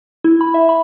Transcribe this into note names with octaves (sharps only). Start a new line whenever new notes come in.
E4
B5
E5
B5